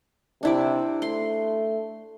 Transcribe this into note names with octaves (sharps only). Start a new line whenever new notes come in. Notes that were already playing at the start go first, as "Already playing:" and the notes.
C3 D4 E4 D6
A3 C6